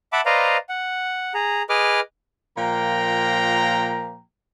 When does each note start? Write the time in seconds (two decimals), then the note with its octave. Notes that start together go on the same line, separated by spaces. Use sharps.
0.13 E5 F#5 A5 B5 D6
0.26 B4 C5 D5 D#5 F5 A#5
0.69 F#5
1.34 G#4 A#5
1.69 G#4 B4 D#5 D6 F6
2.57 A#2 F3 A#3 G5 A#5